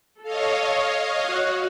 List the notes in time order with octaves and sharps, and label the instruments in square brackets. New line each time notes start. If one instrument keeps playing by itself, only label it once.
[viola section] A4 [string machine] C#5 D#5 F5
[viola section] F#4